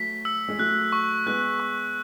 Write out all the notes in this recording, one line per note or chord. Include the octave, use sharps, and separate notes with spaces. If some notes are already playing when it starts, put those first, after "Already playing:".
Already playing: F#3 A3 B6
E6
G#3
F#3 A3 F#6
C#6
G#3 B3 F#6
C#6